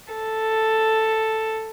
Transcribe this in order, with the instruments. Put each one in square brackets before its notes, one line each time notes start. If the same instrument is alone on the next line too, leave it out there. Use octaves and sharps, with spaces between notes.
[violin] A4